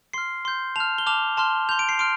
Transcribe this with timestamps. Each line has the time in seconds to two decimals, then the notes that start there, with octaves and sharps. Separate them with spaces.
0.13 C6 F6 C7
0.45 C6 G6
0.76 A5 F6 F7
0.98 G7
1.06 A5 D6 F6 F7
1.37 A5 C6 F6
1.69 G6 F7
1.71 C6
1.79 D7
1.89 C7
1.99 C6 F6 D7